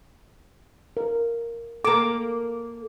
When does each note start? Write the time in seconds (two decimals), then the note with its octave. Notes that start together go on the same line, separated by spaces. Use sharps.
0.97 A#4
1.85 A#3 A4 A#5 D6